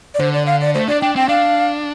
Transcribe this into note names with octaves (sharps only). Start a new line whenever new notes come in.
D5
D3 C5
D5
F5
D5
A3 C5
D4 D5
D4 G5
C4 G5
D4 F5